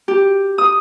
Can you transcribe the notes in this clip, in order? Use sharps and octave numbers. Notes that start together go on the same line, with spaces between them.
G4
D#6